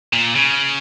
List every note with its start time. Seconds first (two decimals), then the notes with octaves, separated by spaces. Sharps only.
0.13 A#2
0.35 C#3